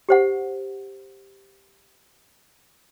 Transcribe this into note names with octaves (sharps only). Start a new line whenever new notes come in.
G4 C5 F#5